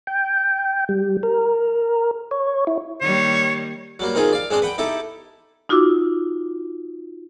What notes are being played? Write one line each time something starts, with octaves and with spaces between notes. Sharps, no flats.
G5
G3
A#4
C#5
E4
D#3 G3 A#3 C#5
F#3 G3 A#3
D#3 C4 D#4 F4 G#4
D5 F5
G#3 C4 D4 C5 D#6
B4 F#5 G5
D#4 E4 G4 A4
D#4 F4 F#4 D6 E6